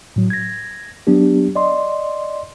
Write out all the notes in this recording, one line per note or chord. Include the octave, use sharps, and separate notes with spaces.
A2 F#3
G#6 A#6
F#3 B3 D4 G4
D5 D#5 C6